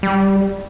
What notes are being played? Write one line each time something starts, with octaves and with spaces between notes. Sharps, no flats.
G3